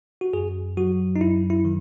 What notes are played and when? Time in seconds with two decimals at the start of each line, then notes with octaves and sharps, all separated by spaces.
0.21 F#4
0.33 F#2 G#4
0.77 F#3 F#4
1.16 D#4
1.20 F#2 E4
1.50 E4
1.65 D#3